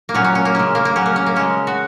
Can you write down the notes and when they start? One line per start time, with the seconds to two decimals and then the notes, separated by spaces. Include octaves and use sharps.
0.09 A#3
0.14 A#2 F#3 C#4
0.24 C#4
0.35 C#4
0.45 A#3
0.55 C#3 G#3 C#4
0.75 A#3
0.85 A#3
0.96 C#3 F#3 C#4
1.06 A#3
1.16 C#4
1.26 A#3
1.36 C#3 G#3 C#4
1.67 F#4